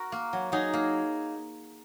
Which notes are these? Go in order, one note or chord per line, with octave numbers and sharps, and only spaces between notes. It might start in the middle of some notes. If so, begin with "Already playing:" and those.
Already playing: F#4 A#4
A#3
F#3
F#3 D#4 G#4
A#3